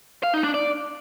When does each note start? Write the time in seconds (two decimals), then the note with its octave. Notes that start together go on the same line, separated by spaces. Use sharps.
0.23 F5
0.34 D#4
0.44 D4
0.54 D5